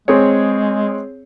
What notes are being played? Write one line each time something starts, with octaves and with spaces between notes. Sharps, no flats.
G#3 C4 G#4 C#5